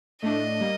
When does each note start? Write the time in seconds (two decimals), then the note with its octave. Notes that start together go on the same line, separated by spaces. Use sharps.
0.22 A2 A3 D4 D#5
0.61 G3 A#3